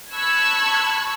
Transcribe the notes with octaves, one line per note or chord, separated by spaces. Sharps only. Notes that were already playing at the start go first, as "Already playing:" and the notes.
A5 B5 C#6 E6 F#6 G#6